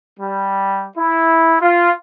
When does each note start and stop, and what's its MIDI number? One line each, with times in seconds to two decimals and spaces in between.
0.18 0.87 55
0.97 1.55 64
1.60 1.92 65